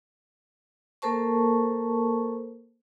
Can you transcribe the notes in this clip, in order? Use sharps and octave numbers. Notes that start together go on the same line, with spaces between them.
A#3 A4 A#4 C5 A5 C#6